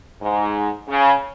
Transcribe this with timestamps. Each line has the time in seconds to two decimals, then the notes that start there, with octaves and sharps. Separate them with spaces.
0.22 G#2
0.89 C#3